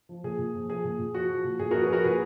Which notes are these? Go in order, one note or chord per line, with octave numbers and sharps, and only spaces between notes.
F3
A#2 G#4
A#2
F3
F3 G#4
A#2
A#2
F3 F#4
F3
A#2
A#2 G#4
F3 F#4 A#4
G#4 B4
F3 F#4 A#4
A#2 G#4 B4